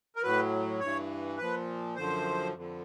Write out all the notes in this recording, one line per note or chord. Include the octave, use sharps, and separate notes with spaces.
A#4
A2 F#3 B4
G2 E3 C#5
A#2 F3 B4
F#2 D3 F3 C5
F2 D3 F3